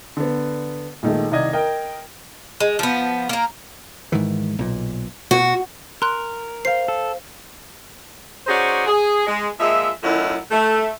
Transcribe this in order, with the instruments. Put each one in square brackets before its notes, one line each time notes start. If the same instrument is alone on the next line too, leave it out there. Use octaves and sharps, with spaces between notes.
[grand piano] D3 B3
A#1 D#3 G#3 A3
C2 D#3 D5 D#5 G#6
A#4 D#5 G5
[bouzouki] G#3
F3 B3
A#3 A#4
[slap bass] G#2 D#3 E3
B1 A#2
[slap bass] B2 [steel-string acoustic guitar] F#4
[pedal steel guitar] A#4 [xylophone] C6 F#6
[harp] C5 F5 [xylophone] C7
[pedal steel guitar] A4
[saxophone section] C#4 D#4 F#4 G#4 C5 D5
G#4
G#3
A#2 F3 G#3 E5
F#2 A2 D#3 F#3 E4 F4
A3